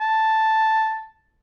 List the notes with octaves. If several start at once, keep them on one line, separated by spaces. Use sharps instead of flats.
A5